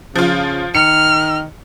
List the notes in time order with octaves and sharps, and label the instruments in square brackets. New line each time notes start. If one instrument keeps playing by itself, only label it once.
[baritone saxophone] C#3 [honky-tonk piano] F3 F4
[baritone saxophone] D#3 [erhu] F6 [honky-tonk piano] C#7